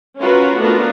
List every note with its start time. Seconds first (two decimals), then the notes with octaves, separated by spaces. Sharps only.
0.18 C#4 F4 F#4 A#4 B4
0.59 A3 B3 D4 F4 F#4 A#4